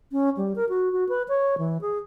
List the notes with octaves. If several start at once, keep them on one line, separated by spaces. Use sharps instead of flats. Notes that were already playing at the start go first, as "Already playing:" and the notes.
C#4
G3
A#4
F#4
F#4
B4
C#5
E3
G#4